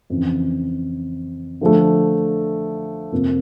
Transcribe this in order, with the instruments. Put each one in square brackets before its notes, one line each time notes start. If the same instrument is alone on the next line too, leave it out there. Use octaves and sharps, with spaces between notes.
[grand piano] F2 C#3 E3
D3 F3 A3
F2 C3 F3 A#3